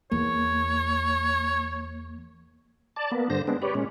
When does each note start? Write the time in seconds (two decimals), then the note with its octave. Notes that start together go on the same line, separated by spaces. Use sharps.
0.11 E2 A#3 C#5
2.96 D5 A5
3.11 A#3 B3
3.30 G2 D3 C5 A#6
3.47 G#3 B3 C4 D4
3.62 G4 B4 C#5 D5
3.75 A#2 G#3 C#4